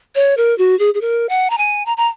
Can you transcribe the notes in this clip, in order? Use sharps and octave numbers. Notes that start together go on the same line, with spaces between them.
C#5
A#4
F#4
G#4
G#4
A#4
F#5
A#5
G#5
A#5
A#5